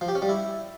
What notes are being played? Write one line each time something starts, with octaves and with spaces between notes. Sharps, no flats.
F3
G4
C#4
G3
E4